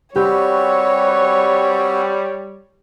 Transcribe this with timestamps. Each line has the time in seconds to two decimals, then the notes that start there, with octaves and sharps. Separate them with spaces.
0.16 G3 C4 F#4 G4 B4 C#5